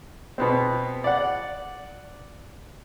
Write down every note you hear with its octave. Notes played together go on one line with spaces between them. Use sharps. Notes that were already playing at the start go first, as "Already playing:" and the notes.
B2 B3 C4
D5 F#5